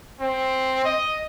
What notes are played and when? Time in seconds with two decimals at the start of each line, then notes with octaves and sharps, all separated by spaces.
0.20 C4
0.84 D#5